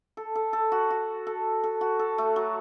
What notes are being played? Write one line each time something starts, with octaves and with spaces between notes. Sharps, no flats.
A4
A4
A4
F#4
F#4
A4
A4
F#4
A4
A3
F#3